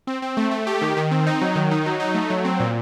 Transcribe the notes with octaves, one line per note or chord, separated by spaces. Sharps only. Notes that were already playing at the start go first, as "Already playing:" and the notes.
C4
C4
A3
A3
G4
D#3
D#3
C4
D#4
F#3
D#3
D#4
F#3
D#4
A3
F#3
C4
A#2